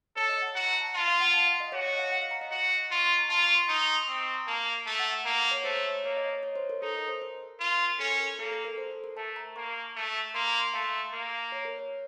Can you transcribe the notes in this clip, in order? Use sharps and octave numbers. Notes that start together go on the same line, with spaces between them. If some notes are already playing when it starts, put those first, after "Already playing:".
A4 C#5
D#5
F#5
F#4 A#5
A#5
A5
F4 A5
F5
F#5
A5
F5
D#5
F#4 C#5
D#5
F5
F#5
F5
A#5
D#5
F#4
F4 C#6
C6
A#5
F4 A5
C#6
C6
D#4 C6
C#6
D#6
C4 D#6
C#6
A#5
A#3 A5
A3 A5
F#5
F#5
A#3 A#5
A#5
C#5
A3 C5
C#5
A#3 C#5
D#5
D#5
C#5
C5
A#4
D#4 A4
A#4
C5
A#4
F4
C#4 A4
A#4
A#3 A4
A4
A#4
C5
A4
A#4
A3 A5
A#5
A#3 C#6
A3
A#3 C6
A#5
C6
A3 F5
A#3
C#5
A#4
C#5